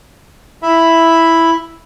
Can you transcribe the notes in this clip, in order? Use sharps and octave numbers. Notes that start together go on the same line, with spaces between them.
E4 E5 B5